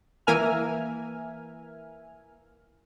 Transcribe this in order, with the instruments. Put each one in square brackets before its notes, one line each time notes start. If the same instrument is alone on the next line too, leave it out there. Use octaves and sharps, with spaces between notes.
[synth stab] E3 A#3 A#4 E5 G#5 F6